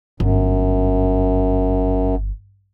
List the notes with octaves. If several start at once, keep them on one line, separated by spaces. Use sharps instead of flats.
G1 F#2